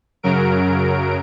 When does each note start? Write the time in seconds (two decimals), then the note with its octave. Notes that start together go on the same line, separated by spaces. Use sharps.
0.23 F#2 C#3 F#3 A#4 D7